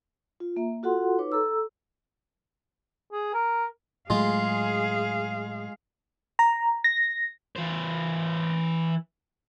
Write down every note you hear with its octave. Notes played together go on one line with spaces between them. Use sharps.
F4
A#3 E5 A#5
F4 F#4 A4 F#5 C6
D#4 B4 C#5 D6
A4 A#5 E6
G#4
A#4
A2 F#3 G#3 A3 F4 G#4 F5
A#5
A#6
E3 C5